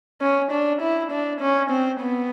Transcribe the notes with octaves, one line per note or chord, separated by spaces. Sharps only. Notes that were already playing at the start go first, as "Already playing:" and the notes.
C#4
D4
E4
D4
C#4
C4
B3